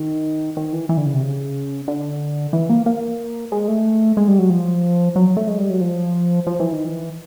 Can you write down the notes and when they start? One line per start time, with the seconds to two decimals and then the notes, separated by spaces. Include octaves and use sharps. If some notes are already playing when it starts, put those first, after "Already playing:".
Already playing: D#3
0.57 D#3
0.73 E3
0.89 E3
0.97 D3
1.06 C#3
1.14 C3
1.22 C#3
1.88 D3
2.53 E3
2.70 A#3
2.86 A#3
3.52 G#3
3.68 A3
4.17 G#3
4.28 G3
4.39 F#3
4.50 F3
5.16 F#3
5.37 A3
5.48 G#3
5.58 G3
5.70 F#3
5.81 F3
6.47 F3
6.60 E3
6.73 D#3
6.86 E3